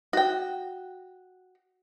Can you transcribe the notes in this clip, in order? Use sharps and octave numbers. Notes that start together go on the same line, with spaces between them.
F#4 G5